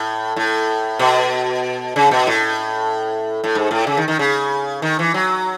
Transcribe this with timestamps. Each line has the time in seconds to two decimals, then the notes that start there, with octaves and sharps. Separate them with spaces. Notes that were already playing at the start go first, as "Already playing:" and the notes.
Already playing: A2
0.36 A2
0.99 B2
1.96 C#3
2.11 B2
2.27 A2
3.44 A2
3.55 G#2
3.71 A2
3.87 C#3
3.97 D#3
4.08 D#3
4.19 C#3
4.82 D#3
4.99 E3
5.14 F#3